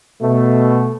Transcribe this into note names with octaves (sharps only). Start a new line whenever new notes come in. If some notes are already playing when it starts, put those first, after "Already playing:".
B2 A3